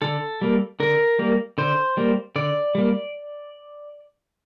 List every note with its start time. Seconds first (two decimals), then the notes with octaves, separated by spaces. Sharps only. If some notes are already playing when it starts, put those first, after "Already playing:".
0.02 D3 A4
0.41 G3 A#3
0.80 D3 A#4
1.19 G3 A#3
1.58 D3 C5
1.97 G3 A#3
2.36 D3 D5
2.75 G3 A#3